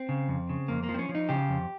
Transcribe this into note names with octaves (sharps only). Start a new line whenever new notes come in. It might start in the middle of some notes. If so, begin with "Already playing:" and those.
Already playing: C4
C#3
F2
C#3
F2 A#3
A#3
F3
C4
C#4
F3
D#4
C#3 G4
F2